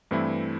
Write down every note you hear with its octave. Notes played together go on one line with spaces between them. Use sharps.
G2 E3 A3 C4 E4